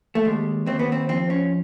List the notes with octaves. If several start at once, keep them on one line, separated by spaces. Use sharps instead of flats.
A3
D#2 G#3
D#2 C4
B3
C4
F3 C4
C#4